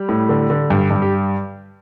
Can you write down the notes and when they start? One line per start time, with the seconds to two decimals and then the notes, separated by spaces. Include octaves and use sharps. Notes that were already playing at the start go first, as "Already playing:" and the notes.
Already playing: G3 G4
0.09 A2
0.29 D3
0.50 D3
0.70 G2
0.91 G2
1.02 G4